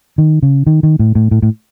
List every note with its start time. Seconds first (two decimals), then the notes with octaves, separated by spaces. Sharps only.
0.18 D#3
0.43 C#3
0.67 D#3
0.83 D#3
0.99 A2
1.15 A2
1.31 A2
1.42 A2